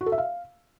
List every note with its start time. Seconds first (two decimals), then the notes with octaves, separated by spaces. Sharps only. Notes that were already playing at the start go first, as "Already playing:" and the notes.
0.01 F#4
0.06 A4
0.12 E5
0.18 F5